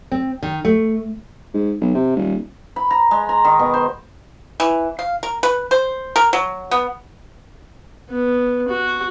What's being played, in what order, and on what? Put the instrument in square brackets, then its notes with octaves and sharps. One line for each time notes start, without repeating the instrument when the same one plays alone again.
[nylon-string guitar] C4
D#3
A3
[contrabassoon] G#2
B1
C3
D#1
[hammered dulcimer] B5
A#5
G#3
A#5
D#3
B2
C5
[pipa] E3
F5
A#4
B4
C5
A#4
F#3
B3
[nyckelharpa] B3
F#4